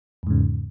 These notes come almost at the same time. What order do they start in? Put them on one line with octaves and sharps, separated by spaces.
E2 G#2 C#3